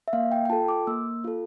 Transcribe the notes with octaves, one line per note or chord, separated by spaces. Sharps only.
E5
A#3 F5
G5
G5
F4 A4 A5
D6
A#3 E6
F4 A4